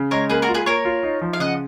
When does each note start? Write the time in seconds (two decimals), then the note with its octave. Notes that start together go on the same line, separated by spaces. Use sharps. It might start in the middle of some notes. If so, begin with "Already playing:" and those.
Already playing: C#3
0.11 G#3 A#4 C#5
0.30 A#3 G#4 B4
0.42 F#4 A#4
0.49 F4
0.54 G#4 B4
0.66 A#3 A#4 C#5
0.85 F4
1.03 D#4
1.22 F3
1.33 F5
1.40 C#3 D#5 F#5